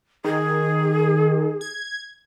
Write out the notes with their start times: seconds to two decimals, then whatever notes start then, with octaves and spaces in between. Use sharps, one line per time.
0.25 D#3 G#4
1.61 G#6